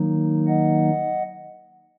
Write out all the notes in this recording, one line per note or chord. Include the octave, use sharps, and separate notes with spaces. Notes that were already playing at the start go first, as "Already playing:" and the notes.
Already playing: D#3 F#3 A#3 D#4
D#5 F#5